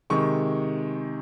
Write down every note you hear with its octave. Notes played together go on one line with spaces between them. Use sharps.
C3 D#3 G#3 C#6